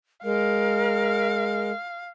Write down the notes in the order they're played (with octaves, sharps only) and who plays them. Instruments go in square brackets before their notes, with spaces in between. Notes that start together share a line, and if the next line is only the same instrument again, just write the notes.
[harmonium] G#3 [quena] A#4 [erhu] F5